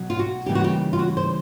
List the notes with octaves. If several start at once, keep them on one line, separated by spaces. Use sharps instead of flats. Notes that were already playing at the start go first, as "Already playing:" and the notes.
Already playing: B2 F#3
F4
F#4
C#3 E3 G3 A#3 D#4 G4
F#4
G4
F4
F#4
C5